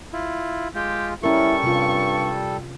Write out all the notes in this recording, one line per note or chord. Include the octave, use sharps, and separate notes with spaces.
E4 F4
G#3 F4 G4
G3 C#4 E4 A4 A#4 C#6
G2 C3 F4